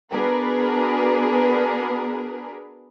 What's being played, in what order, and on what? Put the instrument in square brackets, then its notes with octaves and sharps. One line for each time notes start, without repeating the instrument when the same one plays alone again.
[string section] B3 D4 F#4 G#4 A#4 B4